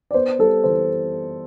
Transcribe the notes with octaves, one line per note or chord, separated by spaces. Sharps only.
D5
B3 C5
G3 A4
E3 C5